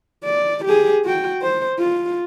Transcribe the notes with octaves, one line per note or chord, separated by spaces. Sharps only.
D5
G4 G#4
F#4 G5
C5
F4